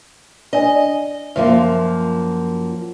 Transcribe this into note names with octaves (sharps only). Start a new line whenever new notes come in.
D4 D5 D#5 G#5
F#2 F3 A#3 E5 F5 C6